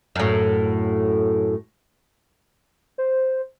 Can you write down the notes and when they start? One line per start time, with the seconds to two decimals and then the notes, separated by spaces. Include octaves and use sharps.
0.16 F#2 A2
2.98 C5